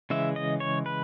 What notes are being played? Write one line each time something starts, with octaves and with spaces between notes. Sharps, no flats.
C#3 E3 G#3 E5
D#5
C#5
B4